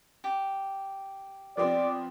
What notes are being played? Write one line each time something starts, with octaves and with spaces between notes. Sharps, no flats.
G4
F3 B3 C4 D5